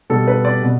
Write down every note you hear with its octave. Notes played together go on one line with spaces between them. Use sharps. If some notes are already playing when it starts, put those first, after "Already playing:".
B2 G3 A4
B4
D5
B2